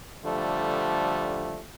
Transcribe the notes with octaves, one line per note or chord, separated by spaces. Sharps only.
D3 F3 G3 A3